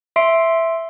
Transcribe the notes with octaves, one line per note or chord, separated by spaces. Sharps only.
E5 C6 C7 D7